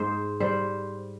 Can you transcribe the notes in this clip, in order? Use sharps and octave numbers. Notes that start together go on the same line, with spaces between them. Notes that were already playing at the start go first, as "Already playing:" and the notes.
Already playing: G#2 C5
G3 C5